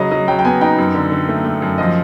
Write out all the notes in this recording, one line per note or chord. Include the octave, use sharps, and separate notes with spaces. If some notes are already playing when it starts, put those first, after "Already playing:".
Already playing: C#3 F#3 D#5
F#3 D#5
F#3 G5
G5
B3 G#5
D#4 G5
F#2
D3
D3
A3
A3
F#2
F3 D#5